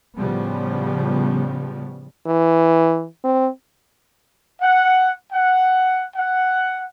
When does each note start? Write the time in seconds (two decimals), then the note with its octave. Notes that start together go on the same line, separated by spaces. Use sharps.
0.18 A2 C#3 F3 G3 B3
2.27 E3
3.24 C4
4.61 F#5
5.32 F#5
6.15 F#5